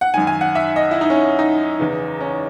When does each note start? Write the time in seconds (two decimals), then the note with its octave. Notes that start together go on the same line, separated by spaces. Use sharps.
0.01 F#5
0.14 F#2 D#3 G#5
0.27 G#5
0.41 F#5
0.55 E5
0.76 D#5
0.91 E4
1.01 D#4
1.10 C#4
1.39 D#4
1.79 E2 C#3 E3
2.20 C#4